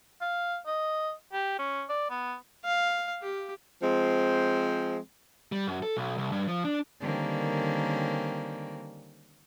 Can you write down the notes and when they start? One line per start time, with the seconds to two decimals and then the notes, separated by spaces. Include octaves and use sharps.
0.21 F5
0.66 D#5
1.33 G4
1.59 C#4
1.89 D5
2.10 B3
2.65 F5
3.22 G4
3.82 F3 G#3 C4
5.52 G3
5.67 F#2
5.82 A4
5.97 B1
6.18 C2
6.32 G2
6.48 F3
6.64 D4
7.01 D3 D#3 G3 A#3 C4 C#4